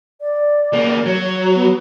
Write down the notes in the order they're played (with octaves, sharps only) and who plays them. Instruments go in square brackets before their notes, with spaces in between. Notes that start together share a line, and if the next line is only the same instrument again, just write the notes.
[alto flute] D5
[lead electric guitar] C#2 A#3
[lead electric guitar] F#3 [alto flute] C#5
[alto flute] B3